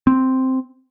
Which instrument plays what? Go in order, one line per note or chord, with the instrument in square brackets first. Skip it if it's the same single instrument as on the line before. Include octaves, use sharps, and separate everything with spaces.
[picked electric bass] C4